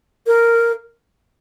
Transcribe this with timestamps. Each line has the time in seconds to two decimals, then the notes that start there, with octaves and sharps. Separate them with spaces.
0.27 A#4